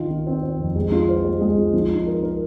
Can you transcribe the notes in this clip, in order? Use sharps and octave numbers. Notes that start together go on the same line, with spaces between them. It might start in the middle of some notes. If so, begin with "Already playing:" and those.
Already playing: D#3 F4
F4
C4
C4
F2
G#3
F4
C5
G#3
G#3
F4
F3
D#4
A#4
A#4